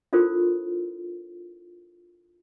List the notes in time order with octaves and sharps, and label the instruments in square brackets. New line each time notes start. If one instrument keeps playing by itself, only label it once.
[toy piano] D4 E4 F4 A4 A#4 C5